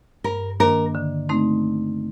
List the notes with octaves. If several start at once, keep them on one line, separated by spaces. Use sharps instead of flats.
G2 A#4
D#3 A#3 D4 A#4
D3
A3 C4 D#4